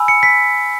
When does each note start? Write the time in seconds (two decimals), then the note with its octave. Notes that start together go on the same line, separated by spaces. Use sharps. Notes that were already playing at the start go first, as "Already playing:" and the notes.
Already playing: G#5 B5 E6
0.08 C#7
0.23 B6